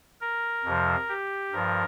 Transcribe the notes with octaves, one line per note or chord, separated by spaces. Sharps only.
A#4
F2 C3 F3
G4
G2 F3 A#4